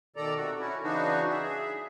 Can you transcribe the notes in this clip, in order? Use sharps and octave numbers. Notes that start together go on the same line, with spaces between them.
B2 D#3 A4 D5 A#5
C3 F#4 A4
C#4 E4 F#4
C#3 E3 B3 D4 D#4 F#4
G#4 E5